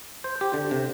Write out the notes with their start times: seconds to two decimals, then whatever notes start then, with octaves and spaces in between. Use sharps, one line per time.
0.24 C5
0.41 G4
0.54 D3
0.71 C3